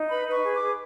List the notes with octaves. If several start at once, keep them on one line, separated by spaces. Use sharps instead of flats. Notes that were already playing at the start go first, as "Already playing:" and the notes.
Already playing: D#4
B4 B5
B4
C#6
G#4
D6
G#4